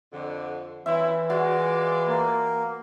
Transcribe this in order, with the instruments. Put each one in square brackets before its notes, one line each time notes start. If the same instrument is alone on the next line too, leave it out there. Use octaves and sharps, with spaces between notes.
[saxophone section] F2 D3
[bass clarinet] E3 [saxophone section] C4 C#4 E4 [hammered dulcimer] E5
[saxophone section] G#3 F4 D5 [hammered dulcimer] F#4
[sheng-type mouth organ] A#3